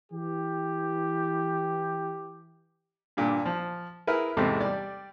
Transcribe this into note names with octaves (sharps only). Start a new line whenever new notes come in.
E3 G4
G2 A#2 D3
F3
E4 G#4 A#4 B4
E2 G#2 C3 A3
G3 D5